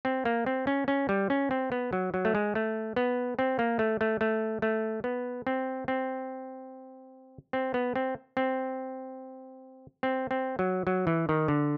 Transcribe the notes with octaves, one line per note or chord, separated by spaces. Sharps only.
C4
A#3
C4
C#4
C#4
G3
C#4
C4
B3
F#3
F#3
A3
G#3
A3
B3
C4
A#3
A3
A3
A3
A3
B3
C4
C4
C4
B3
C4
C4
C4
C4
F#3
F#3
E3
D#3
D3